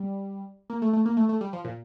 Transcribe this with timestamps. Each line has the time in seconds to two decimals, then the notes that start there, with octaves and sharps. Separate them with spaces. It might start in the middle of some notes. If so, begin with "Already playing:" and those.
Already playing: G3
0.70 A#3
0.82 A3
0.93 A3
1.06 A#3
1.17 A3
1.29 A3
1.41 G3
1.53 F3
1.64 A#2